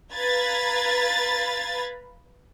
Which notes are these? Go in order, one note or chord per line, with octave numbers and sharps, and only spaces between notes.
B4 F5 A#5 B5 G#6 A6